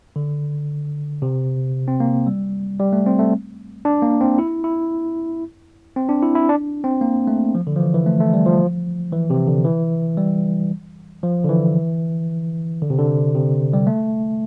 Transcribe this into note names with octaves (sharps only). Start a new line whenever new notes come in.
D3
C3
C4
A#3
G3
G3
A3
C4
A3
D4
A#3
C4
E4
E4
C4
D4
E4
E4
D4
C4
A#3
A3
F3
D3
F3
E3
E3
A3
A3
G3
F3
E3
C3
D3
E3
G3
F3
D3
E3
D3
C3
D3
C3
G3
A3